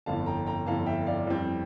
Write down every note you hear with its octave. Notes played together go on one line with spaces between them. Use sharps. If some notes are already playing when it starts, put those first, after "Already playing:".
G1 F2 E3 F5 A5
G5 A#5
G5 A#5
G1 F2 E3 F5 A5
E5 G5
D5 F5
F2 E3 G3 C4